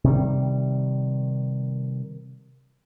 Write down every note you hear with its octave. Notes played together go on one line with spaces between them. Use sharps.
C3 D#3 G3